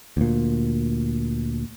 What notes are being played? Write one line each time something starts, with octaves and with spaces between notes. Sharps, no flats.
D2 A#2